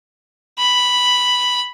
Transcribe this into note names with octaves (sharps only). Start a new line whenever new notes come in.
B5